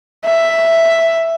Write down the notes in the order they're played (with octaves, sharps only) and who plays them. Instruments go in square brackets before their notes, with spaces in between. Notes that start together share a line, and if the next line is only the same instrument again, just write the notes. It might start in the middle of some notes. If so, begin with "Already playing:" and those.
[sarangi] E5